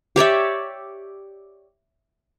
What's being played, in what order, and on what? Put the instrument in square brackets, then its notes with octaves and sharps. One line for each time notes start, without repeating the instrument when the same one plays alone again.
[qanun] G4 C#5 D5 E5